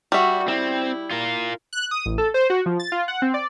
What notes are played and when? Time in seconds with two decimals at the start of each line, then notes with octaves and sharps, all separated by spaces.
0.12 G3 F#4 E5
0.48 C4 E4
1.11 F4 A#4
1.73 F#6
1.91 D#6
2.06 A1
2.18 A4
2.34 C5
2.50 F#4
2.66 F3
2.79 A6
2.92 F4
3.08 F#5
3.22 C4
3.34 D5